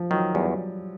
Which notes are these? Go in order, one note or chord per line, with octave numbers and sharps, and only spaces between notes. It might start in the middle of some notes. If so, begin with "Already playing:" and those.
Already playing: F3
D#3 F#3
E2 G3